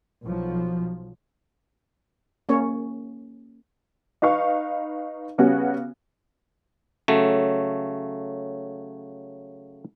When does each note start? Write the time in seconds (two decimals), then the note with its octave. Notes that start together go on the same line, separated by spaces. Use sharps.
0.25 B1 F3 F#3
2.49 A#3 C#4 C#5
4.22 D#4 B4 F5 C#6
5.38 C#3 G3 B3 C#4 F#4
7.08 C#3 F#3 A3